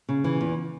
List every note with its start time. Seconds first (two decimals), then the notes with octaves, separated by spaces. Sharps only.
0.09 C#3
0.24 E3
0.41 E2